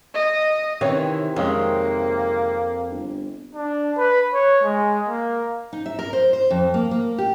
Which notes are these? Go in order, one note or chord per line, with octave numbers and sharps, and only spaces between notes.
D#5
C3 D#3 E3 C4 C#4 C#5
F2 D#3 G#3 A#3 C#4
G1
D4
B4
C#5
G#3
A#3
D#4
E5
A#4
C5
C5
F2
A#3
A#3
G4